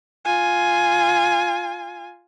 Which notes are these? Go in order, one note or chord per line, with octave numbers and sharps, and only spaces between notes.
F4 G#5